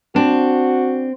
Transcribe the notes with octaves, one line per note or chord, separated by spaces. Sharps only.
C4 D4 F#4